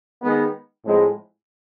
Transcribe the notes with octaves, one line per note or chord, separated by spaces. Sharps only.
D#3 G#3 B3
A2 F3 G#3 C4